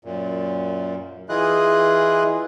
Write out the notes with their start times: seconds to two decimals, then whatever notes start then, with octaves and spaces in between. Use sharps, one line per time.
0.05 F#2 A#2
1.29 E3 E4 F4 G#4 D#5 F#6